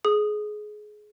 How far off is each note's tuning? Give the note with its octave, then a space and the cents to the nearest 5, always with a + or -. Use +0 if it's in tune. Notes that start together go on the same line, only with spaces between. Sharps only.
G#4 +25 D#6 -15